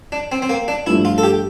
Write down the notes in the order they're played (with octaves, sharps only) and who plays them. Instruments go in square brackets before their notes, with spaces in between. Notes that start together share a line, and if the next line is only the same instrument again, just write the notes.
[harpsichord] D4
C4
C4
A#3
D4
[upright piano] G2 F3 A3 [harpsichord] E4
[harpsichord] F4
A4
G4